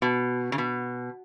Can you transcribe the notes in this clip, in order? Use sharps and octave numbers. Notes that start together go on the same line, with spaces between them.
B2
C#3
B2